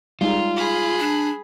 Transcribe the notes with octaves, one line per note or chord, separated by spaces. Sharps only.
G3 G#3 D#4 F4
G#4 B5
D4